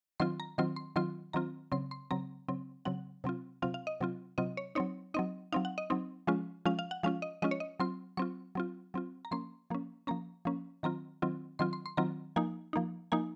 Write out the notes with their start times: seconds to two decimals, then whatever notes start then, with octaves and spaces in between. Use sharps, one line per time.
0.20 D#3 F#3 C4 F4 C6
0.40 A#5
0.58 D#3 F#3 C4 F4 C6
0.76 C6
0.96 D#3 F#3 C4 F4 C6
1.33 D#3 F#3 C4 F4 A#5
1.72 C#3 F#3 C4 C6
1.91 C6
2.11 C#3 F#3 C4 A#5
2.48 C#3 F#3 C4
2.85 C#3 F#3 C4 F#5
3.24 C3 F#3 C4 F4
3.62 C3 F#3 C4 F4 F5
3.74 F5
3.87 D#5
4.01 C3 F#3 C4 F4
4.38 C3 F#3 C4 F4 D#5
4.57 C#5
4.75 F#3 C4 D#4 C#5
5.14 F#3 C4 D#4 D#5
5.53 F#3 C4 D#4 F5
5.65 F#5
5.78 D#5
5.90 F#3 C4 D#4
6.27 F3 G#3 C#4 F4
6.65 F3 G#3 C#4 F4 F5
6.79 F5
6.91 F#5
7.03 F3 G#3 C#4 F4 F5
7.22 D#5
7.42 F3 G#3 C#4 F4 D#5
7.51 C#5
7.60 D#5
7.80 F#3 C4 F4 C6
8.17 F#3 C4 F4 C#6
8.55 F#3 C4 F4
8.94 F#3 C4 F4
9.25 A#5
9.31 F3 A#3 C#4 C6
9.70 F3 A#3 C#4
10.07 F3 A#3 C#4 A#5
10.45 F3 A#3 C#4
10.83 D#3 F#3 C4 F4 A#5
11.22 D#3 F#3 C4 F4
11.59 D#3 F#3 C4 F4 C6
11.73 C6
11.86 C6
11.97 D#3 F#3 C4 F4 A#5
12.36 F3 A#3 D#4 G#5
12.73 F3 A#3 D#4
13.12 F3 A#3 D#4 G#5